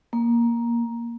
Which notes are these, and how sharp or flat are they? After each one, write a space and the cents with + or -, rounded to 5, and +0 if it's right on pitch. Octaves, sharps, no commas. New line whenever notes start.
A#3 +10